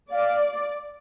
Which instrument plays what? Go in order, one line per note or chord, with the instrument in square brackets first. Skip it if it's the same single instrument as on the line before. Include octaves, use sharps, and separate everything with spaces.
[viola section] D5 [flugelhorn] F5